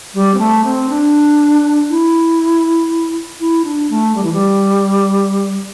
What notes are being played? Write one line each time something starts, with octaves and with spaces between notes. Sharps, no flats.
G3
C4
A3
C4
D4
E4
E4
D4
A3
G3
E3
G3